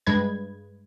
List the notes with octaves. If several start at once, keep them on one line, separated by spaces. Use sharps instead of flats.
G2 G#3 B4 G#6